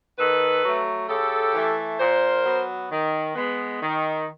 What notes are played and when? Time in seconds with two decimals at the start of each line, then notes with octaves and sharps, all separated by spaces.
0.18 D#3 A4 B4
0.63 F#3 A3
1.09 C#3 G4 A4
1.55 E3 A3
1.99 A#2 A#4 C5
2.45 F#3 B3
2.91 D#3
3.35 G#3 B3
3.81 D#3